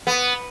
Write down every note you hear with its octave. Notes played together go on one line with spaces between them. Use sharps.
B3